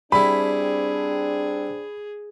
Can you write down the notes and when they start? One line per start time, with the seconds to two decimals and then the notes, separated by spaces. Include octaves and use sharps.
0.12 G3 C4 D4 E4 G#4 B5